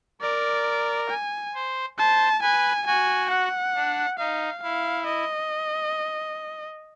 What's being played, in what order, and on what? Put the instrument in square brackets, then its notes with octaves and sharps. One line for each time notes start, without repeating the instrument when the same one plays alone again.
[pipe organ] A#4 [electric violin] D5
[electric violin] G#5
[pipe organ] C5
[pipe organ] C5 [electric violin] A5
[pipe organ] B4 [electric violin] G#5
[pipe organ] F#4 [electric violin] G#5
[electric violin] F#5
[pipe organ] D4
[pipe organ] D#4 [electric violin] F5
[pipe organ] E4 [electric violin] F5
[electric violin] D#5